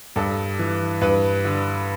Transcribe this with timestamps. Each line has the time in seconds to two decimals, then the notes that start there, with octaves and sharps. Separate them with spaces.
0.16 G2 A4
0.59 E3
1.01 G2 B4
1.45 D3